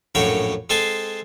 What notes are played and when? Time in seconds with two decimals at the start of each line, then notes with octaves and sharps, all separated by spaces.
0.15 A#1 F#2 A2 F#4 C#5 G5
0.70 G#3 C4 A4 G#5 A5 C6